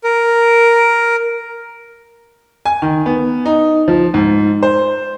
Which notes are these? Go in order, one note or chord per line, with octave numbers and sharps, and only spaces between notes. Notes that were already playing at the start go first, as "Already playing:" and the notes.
A#4
G#5
D#3
B3
D#4
F3
G#2
C5